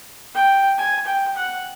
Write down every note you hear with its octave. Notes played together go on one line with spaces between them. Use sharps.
G5
G#5
G5
F#5